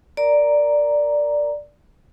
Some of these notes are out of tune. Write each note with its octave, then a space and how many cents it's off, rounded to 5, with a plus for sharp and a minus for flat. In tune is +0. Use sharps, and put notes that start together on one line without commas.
A#4 +0 D5 +0 A#5 +0